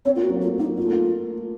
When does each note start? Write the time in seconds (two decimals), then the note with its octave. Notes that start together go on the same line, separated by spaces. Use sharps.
0.05 C4 C#5
0.16 A#3 F4
0.23 F#4
0.29 F#3
0.36 A#3
0.41 A3 F4
0.59 A#3 D#4
0.78 A#3 F4
0.86 A3
0.92 A#3